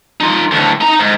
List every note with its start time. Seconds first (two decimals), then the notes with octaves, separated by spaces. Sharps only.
0.20 D#4 F4
0.51 D2 A2
0.81 D#4 A#5
0.99 G#2